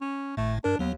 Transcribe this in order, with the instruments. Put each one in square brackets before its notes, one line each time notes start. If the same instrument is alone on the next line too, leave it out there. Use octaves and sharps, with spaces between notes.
[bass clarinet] C#4
[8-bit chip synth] G#1 A2 [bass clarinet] A3
[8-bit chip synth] G2 A#4 [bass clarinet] D4
[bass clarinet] D#2 [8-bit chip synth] F#3 B3